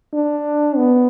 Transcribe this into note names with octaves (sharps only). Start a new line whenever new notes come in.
D4
B3